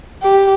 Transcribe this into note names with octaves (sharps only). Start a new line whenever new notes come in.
G4